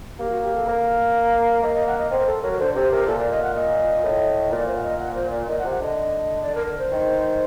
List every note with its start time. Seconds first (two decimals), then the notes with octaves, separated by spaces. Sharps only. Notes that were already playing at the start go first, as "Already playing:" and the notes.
0.18 A#3 G4
0.30 F#4
0.42 G4
0.55 A4
0.66 A#3
1.62 A#3 D#5
1.74 D#5
1.87 F#5
1.98 D#5
2.10 C4 D#5
2.19 A#4
2.26 A4
2.42 F#3 A#4
2.52 A#4
2.59 D3 C5
2.74 C3 C5
2.90 C3 A#4
3.06 A#2 A4
3.18 D5
3.30 D#5
3.42 F#5
3.55 D#5
4.02 A2
4.51 A#2 D5
4.66 C5
4.76 F#5
4.83 D#5
4.99 F#5
5.14 C5
5.31 D5
5.47 A#2 D#5
5.59 F#5
5.63 C3
5.71 F#5
5.79 D3 D#5
6.43 D5
6.55 A#4
6.66 A#4
6.79 C5
6.91 D#3